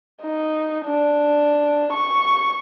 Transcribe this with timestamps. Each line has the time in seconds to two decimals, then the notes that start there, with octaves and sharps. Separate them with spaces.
0.22 D#4
0.86 D4
1.93 C#6